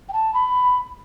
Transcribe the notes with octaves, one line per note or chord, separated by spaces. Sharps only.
G5
A5
B5